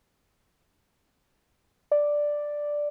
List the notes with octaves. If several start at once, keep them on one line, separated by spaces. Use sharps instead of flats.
D5